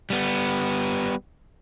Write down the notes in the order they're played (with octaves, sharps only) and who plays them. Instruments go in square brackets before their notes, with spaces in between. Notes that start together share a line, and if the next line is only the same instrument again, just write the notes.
[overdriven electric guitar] G3 B3